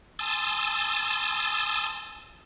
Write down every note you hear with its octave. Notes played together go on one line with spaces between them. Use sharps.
G#5 A5 C6 D#6 E6 A6